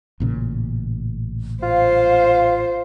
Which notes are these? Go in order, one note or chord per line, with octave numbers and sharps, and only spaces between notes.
A1 A#2 C#3
F4 C5 F5